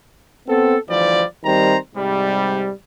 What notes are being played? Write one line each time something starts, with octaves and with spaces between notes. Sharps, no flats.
B3 C4 A4
D2 E3 F3 G3 D5
D#3 G3 C4 C5 A#5
G#2 C3 G3